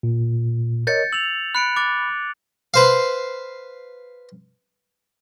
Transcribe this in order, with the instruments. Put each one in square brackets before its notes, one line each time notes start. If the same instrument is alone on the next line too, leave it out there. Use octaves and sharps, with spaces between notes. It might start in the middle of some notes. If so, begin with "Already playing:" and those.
[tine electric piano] A#2
[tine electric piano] A#4 C#5 D#5 [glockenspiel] G6 A6 C#7
[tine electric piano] E6 [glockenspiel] F7 F#7
[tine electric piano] B5 [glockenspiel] F#6 C#7 D7
[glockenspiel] D6 F#6 A6
[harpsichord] B4 C5 F5